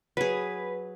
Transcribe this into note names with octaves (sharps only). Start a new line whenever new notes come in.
F#3 G#4 B4